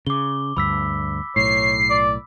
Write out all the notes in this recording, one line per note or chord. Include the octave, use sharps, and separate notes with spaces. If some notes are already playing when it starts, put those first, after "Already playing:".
C#3 D6 G7
D2 G2 B5 E6 B6
B1 A2 C#5 C7
D5